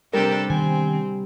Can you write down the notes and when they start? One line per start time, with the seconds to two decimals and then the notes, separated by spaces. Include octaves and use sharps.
0.13 C3 G3 D4 G4 A4 A#4
0.50 D#3 B3 C4 G#5